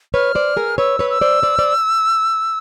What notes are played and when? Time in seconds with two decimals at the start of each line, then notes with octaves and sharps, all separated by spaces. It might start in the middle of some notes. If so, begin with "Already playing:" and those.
0.14 B4 C#5 F6
0.35 C5 D5
0.57 G#4 A#4
0.78 B4 C#5 E6
0.99 B4 C#5
1.10 E6
1.21 C5 D5
1.43 C5 D5
1.59 C5 D5